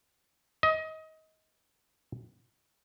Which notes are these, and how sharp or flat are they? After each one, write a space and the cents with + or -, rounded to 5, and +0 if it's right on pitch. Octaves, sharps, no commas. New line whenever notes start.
D#5 +25